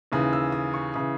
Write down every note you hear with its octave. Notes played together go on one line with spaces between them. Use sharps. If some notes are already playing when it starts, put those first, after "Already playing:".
D#2 C#3 E3 D#6
E6
D#6
C#6
C#3 E3 D#6